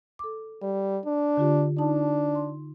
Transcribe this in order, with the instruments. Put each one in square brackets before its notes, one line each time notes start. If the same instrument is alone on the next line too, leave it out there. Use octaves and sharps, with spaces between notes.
[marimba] A4 D6
[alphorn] G3
D4
[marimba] D3 F4 G4
[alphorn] D4 [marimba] D#4 A5
[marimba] C6